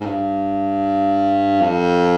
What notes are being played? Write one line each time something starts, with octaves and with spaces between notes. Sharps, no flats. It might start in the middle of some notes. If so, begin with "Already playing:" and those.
G#2
G2
F2